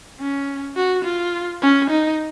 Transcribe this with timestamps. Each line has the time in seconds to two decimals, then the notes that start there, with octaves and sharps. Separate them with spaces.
0.20 C#4
0.77 F#4
1.04 F4
1.62 C#4
1.90 D#4